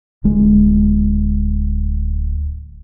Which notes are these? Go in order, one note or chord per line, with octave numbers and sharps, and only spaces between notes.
D1 G#3